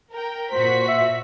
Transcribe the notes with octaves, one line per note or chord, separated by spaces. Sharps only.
A#4 G5
A#2 F#4 C5 B6
E5